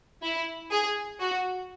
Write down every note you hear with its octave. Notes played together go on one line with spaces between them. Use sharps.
E4
G#4
F#4